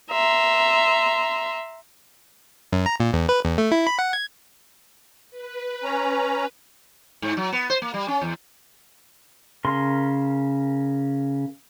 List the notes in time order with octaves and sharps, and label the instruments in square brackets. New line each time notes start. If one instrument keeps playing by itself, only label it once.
[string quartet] E5 A#5 C6
[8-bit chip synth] F#2
A#5
A#2
E2
B4
E2
A3
E4
B5
F#5
G#6
[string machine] B4
[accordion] C#4 A#5
[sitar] G#2
F#3
B3
C5
A#3
G3
C#4
E2
[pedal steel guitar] C#3 A#4 C6